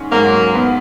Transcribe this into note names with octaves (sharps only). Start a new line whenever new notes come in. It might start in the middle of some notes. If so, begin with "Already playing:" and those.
Already playing: G#2 C#4
G#2 F#3 A#3
B3